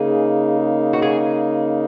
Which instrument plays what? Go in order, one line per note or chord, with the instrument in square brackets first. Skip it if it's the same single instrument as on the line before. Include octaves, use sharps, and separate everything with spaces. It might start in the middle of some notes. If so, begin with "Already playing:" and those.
Already playing: [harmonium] C#3 A#3 D#4 [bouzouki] G#4
[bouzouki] F#4
G#4